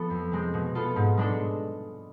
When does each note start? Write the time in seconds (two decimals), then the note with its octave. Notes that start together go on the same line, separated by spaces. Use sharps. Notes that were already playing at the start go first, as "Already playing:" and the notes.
Already playing: F3 B3 A4
0.10 F2
0.32 C3 G#3 C4
0.54 B2
0.75 B3 F4 A4
0.96 G#2
1.17 G#3 D4 A4